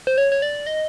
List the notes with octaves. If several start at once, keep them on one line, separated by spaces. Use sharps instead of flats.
C5
C#5
C#5
D5
D#5